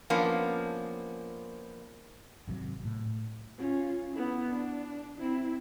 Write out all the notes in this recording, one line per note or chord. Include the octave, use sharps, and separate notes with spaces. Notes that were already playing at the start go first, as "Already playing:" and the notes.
F3 A#3 B3 C#4 D4
G#1 C3 D#3 F#3
A2
C#4 F4
B3 E4
D4
C4 E4